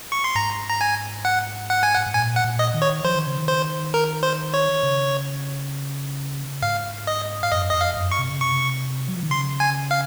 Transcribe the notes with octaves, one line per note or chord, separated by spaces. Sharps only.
C#6
C6
G#2 A#5
A#5
G#5
F#5
F#5
G#5
F#5
G#2
A#2 G#5
F#5
A#2
D#5
D#3
C#5
F3 C5
D#3
C#3
D#3
C5
A#4
C5
C#5
C#3
G#2 F5
D#5
F5
F#2 D#5
F2 D#5
F5
F#2
C#6
C3
C#3
C3 C#6
F#3
F3
D#3
C#3 C6
G#5
F5